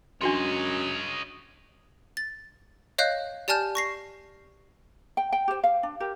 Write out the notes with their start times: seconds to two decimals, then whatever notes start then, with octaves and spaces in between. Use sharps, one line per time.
0.22 F#2 D4 F#4 C#5 D#5 C6
2.17 A6
2.98 C#5 D#5 F5 F#6 G6
3.48 G4 D5 G#5 A5 F6 G6
3.75 C#6 A#6 C7
5.17 G5
5.32 G5
5.48 G4 C5
5.64 F5
5.83 D4
6.00 G4 A#4